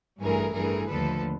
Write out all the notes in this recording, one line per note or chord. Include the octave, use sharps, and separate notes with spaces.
A1 G2 E3 A3 G#4 A#4
G2 E3 A3 G#4 A#4
D#2 D3 F3 A3 A4 B4